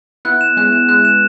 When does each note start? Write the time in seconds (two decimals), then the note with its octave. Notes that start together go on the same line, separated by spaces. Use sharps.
0.25 B3 E4 F#6
0.41 E7
0.57 G#3 C#4 F#6
0.73 E7
0.89 G#3 F#6
1.05 E7